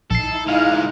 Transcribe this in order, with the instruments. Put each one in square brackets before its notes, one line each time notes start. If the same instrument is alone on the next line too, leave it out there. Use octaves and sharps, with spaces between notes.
[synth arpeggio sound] A#1 C7 [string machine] D#4 E4 [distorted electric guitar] A4
[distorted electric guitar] A#2 G#3 [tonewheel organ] F5